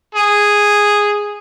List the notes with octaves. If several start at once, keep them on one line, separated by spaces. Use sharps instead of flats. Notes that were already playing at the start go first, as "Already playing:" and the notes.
G#4